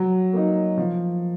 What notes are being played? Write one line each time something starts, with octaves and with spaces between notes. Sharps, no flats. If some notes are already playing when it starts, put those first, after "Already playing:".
Already playing: F#3
A#3 D#4
F3